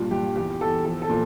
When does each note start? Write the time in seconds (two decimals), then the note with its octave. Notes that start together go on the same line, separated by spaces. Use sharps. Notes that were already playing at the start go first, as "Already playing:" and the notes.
Already playing: G2 A#2 F4
0.11 G2 G4
0.36 E2 G4
0.61 E2 A4
0.85 F3 A4
1.02 A4
1.10 A#2